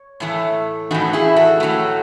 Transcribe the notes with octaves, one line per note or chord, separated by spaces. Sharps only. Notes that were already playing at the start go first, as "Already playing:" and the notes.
Already playing: C#5
A2 E3 A3
A2 E3 A3 D#4 F#4
E4 G#4
F#4 A4
A2 F#3 A3